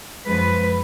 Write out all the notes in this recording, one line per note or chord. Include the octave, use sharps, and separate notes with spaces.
F#2 F3 G#3 B4